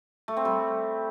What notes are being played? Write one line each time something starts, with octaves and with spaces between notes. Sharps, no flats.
A3
C4
G3